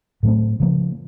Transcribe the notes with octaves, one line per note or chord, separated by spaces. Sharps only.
A2 F#3 A3 C4
C#3 F3 A#3